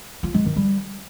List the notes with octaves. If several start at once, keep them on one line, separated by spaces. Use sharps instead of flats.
F4
G#3
D#3
G3